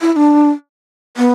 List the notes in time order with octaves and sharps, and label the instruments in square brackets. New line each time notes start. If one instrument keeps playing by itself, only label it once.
[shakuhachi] E4
E4
D4
B3